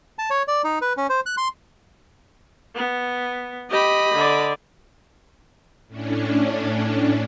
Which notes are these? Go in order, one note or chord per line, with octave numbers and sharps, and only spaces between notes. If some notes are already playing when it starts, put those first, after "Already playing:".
A5
C#5
D5
D#4
B4
C#4
C5
F#6
C6
B3
G4 D#5 B5
D3 D5
A2 C#4 D4